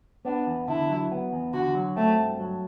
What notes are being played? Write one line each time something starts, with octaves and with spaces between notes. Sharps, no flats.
B3 D4
E2
D3 E4
F#3
B3
E2
D3 F#4
F#3
A3 C4
G2
F#3